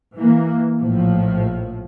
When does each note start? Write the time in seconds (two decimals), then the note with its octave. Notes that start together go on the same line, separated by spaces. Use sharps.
0.16 E3 A#3
0.79 A#1 A2 F3